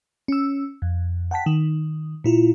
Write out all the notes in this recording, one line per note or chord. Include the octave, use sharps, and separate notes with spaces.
C#4 E6
F2
F#5 G5 A5 B6
D#3
A#2 E4 F4